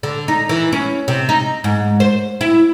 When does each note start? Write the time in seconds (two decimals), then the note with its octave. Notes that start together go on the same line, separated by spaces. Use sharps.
0.03 D3
0.28 D#4
0.49 E3
0.72 C#4
1.08 C3
1.29 D#4
1.64 G#2
2.00 C5
2.41 E4